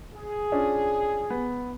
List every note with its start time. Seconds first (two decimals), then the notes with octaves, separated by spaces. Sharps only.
0.15 G#4
0.52 C#4 D4 F4
1.30 B3